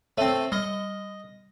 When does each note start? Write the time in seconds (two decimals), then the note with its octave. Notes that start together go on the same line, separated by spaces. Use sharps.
0.18 A3 C4 C#5 E5 D#7
0.52 G3 D#5 G7